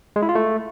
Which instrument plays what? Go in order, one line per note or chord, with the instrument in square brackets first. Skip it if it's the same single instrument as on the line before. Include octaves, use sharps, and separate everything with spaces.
[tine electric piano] G#3
E4
F4
A3